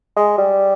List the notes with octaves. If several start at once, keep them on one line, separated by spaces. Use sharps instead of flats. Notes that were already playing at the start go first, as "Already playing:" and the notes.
G#3
G3